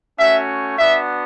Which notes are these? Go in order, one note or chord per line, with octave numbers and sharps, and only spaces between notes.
A3 C#4 F#4 E5
B3 D4 F#4 E5